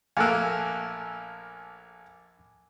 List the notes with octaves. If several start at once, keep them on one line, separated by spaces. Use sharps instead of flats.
A#1 A3 A#3 F5 G#5 A5 E6 F#6